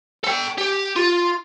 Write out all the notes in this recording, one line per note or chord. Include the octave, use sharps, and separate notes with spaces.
A4 G5
G4
F4